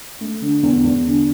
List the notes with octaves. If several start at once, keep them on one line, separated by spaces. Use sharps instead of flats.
A3
D3
E2
E2
D3